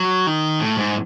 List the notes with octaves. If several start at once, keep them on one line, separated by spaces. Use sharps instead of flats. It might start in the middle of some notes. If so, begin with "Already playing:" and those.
Already playing: F#3
D#3
A2
G#2